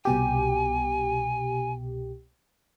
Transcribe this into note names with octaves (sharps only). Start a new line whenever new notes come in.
C2 B2 G4 G#5